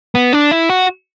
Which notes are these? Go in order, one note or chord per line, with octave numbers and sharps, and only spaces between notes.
B3
D4
E4
F#4